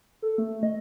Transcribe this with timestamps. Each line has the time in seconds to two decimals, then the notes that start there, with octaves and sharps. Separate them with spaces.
0.22 A4
0.38 A3
0.63 D#5